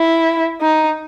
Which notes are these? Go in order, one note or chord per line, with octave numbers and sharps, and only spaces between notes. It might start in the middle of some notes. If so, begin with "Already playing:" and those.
Already playing: E4
D#4